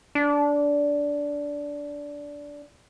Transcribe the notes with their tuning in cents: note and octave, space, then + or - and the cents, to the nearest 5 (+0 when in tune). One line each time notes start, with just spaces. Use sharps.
D4 -15